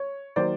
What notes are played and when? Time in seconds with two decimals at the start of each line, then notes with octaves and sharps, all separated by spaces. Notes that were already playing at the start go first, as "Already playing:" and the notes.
Already playing: C#5
0.36 D#3 F#3 A#3 C5 D5